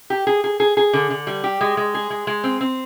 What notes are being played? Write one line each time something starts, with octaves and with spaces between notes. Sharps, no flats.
G4
G#4
G#4
G#4
G#4
D3
D3
G3
G4
G#3
G#3
G#4
G#3
G#3
C4
C4